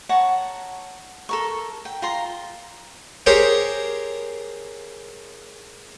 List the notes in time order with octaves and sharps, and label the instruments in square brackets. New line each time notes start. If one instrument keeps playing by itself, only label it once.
[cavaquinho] C#5 F#5 A5 A#5
A4 A#4 C#6
G5
F4 A#5 C6
[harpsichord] G4 G#4 A#4 C5 C#5